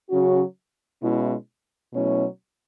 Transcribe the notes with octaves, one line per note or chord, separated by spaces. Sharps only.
C#3 F#3 C#4 F#4
B2 G#3 C#4 E4
B2 F#3 A3 C#4 E4